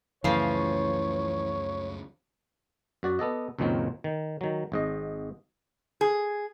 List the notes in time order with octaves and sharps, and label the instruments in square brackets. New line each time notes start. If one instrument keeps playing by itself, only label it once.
[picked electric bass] C#2 F#2 A3 [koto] C#3 F3 [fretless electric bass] E3 [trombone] C#5
[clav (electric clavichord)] F#2 F#4 D5
B3 A4 D5 D#5
C#2 F#2 A#2 D#3 F#3 C4
D#3
D#3 F#3
G#1 G#2 D#5
[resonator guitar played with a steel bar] G#4